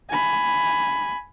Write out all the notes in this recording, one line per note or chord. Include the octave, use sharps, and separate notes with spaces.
G#5 B5